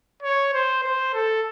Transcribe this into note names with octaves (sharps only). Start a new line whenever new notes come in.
C#5
C5
C5
A4